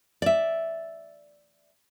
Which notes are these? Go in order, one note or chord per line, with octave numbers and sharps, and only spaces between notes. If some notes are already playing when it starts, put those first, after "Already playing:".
D5 E5